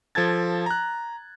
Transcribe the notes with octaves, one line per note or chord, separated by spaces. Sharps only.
F3 A4 A5 G#6 A6
A#5 F#6